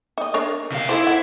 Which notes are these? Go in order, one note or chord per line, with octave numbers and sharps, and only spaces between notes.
D#4 D#5
D4 A#4 C#5
C3 F5
D#4 E4 A4 C5
F#5